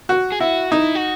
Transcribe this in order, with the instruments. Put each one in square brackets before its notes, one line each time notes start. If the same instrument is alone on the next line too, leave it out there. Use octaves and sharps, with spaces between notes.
[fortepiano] F#4
[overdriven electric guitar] G#4
[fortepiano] E4 [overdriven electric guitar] F#4
[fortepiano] D#4 [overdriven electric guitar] E4
[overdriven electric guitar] F#4